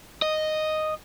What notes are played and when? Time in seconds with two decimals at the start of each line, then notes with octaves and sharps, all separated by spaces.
0.22 D#5